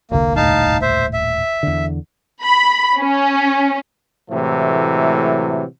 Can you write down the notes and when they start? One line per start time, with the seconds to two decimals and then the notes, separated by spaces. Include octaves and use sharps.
0.11 E1 C2 D3 A#3
0.36 D#1 A2 D#4 F5 A5
0.82 C5 E5
1.13 E5
1.63 E2 D3
2.43 B5
2.99 C#4
4.31 A2 C3 E3 F#3 G#3 A3